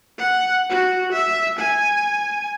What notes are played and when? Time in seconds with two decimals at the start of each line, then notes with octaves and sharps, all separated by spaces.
0.19 F#5
0.70 F#4
1.12 E5
1.59 G#5